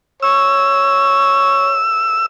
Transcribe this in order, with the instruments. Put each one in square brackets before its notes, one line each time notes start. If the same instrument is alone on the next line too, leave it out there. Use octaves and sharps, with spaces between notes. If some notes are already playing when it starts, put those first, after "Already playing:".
[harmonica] C#5 [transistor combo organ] E6